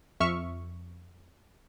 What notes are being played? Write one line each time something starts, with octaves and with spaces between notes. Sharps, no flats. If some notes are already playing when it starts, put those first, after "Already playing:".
F2 E5 C#6 F6